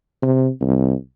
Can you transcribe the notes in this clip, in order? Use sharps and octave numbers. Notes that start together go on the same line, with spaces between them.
C3
C2